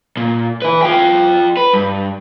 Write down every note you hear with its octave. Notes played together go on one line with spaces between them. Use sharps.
A#2
E4 B4
F4 G5
B4
G2